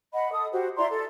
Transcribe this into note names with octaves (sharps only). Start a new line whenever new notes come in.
D#5 F#5 B5
A4 D#6
F#4 G4 C5
E4 D5 A#5 C6
A4